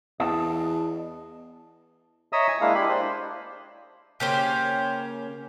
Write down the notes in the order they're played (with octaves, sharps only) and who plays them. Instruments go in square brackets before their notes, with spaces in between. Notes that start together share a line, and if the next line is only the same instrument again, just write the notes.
[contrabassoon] E2 [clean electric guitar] D#5 A5
[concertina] C#5 D#5 E5 A#5 D#6 E6
G#5
G#3 A#3 D4 E4 F5
D4 E4 G4 B5
D4 C5
[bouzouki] C#3 A#3 C#4 [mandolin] G4 C5